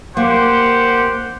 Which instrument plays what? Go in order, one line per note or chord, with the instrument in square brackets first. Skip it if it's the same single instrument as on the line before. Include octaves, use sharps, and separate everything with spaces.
[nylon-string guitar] A#3 [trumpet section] G4 C5 F#5